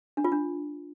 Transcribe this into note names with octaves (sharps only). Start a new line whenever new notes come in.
D4
F4
D4